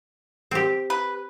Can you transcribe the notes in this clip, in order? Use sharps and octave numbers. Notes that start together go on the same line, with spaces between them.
C4 G4
B4